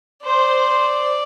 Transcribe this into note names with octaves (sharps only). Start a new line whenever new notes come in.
C5 D5